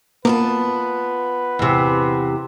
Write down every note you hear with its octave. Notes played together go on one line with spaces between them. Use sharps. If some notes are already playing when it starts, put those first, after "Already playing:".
A#3 B3 F4 A#4 B4 A5
E2 C3